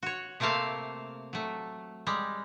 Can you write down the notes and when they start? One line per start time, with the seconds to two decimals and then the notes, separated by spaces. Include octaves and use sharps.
0.03 F#4 C#5
0.40 C3 A3 A#3 C4 F5 A5
1.33 F#3 A3
2.07 G3 G#3